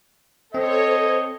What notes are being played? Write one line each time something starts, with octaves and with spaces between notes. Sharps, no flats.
C4 A4 C5 C#5 D#5